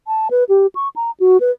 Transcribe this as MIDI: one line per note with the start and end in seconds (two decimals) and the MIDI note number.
0.07 0.28 81
0.31 0.44 71
0.49 0.67 67
0.75 0.88 85
0.96 1.11 82
1.20 1.40 66
1.40 1.51 71